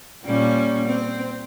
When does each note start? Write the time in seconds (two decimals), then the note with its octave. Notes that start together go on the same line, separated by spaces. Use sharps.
0.24 A#2 G3 C#4
0.86 C4